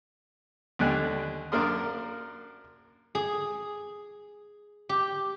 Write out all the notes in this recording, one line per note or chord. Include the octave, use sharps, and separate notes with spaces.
D#2 D3 G3 D4 G#5 F#6
F#2 A#3 D4 A#4 C6 D#6
G#4
G4